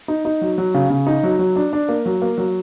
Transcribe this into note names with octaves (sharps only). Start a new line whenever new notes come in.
D#4
D#4
F#3
F#3
C#3
C#3
D#4
F#3
F#3
D4
D4
A#3
F#3
A#3
F#3